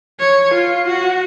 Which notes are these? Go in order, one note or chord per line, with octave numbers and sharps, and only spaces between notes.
C#5
F4
F#4